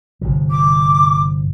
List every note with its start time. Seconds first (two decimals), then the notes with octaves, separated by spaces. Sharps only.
0.21 G1 C3 F3
0.51 D6